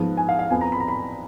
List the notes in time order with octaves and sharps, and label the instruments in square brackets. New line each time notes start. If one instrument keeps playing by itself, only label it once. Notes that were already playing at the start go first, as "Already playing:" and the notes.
Already playing: [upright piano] G#2 F3 B3
G#5
F5
F5
F2 F3 B3 G#5
A#5
B5
A#5
B5